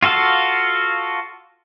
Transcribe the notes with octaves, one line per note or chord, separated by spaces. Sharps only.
F4 F#4 A4 F5